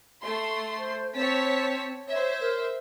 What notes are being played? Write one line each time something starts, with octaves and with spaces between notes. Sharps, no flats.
A3 C6
C5
C4 C#5 A5 B6
C5 C#5 E5
A#4